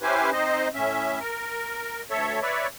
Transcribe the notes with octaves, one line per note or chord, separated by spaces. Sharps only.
C#4 E4 G4 B4 C5 G#5
C4 D#4 C5 D#5
A2 C#4 E5
A#4
D2 A4 C#5 E5
B4 C#5 D5 E5